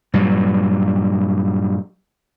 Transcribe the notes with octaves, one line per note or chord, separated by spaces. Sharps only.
G2 A#2 F#3